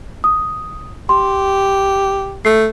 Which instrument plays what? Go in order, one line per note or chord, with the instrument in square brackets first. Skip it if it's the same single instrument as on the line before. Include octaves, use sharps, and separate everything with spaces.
[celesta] D#6
[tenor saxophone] G4 [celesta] C6
[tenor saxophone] A3 [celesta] C7